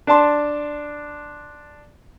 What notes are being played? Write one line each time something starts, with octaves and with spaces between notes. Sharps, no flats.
D4 D5 A5 C6